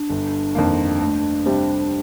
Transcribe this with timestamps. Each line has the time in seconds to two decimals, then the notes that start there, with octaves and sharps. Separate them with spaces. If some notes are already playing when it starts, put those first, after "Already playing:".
Already playing: D4
0.09 G1
0.55 F2 D#3 A#3
1.00 D2
1.46 C3 G3 C4 G4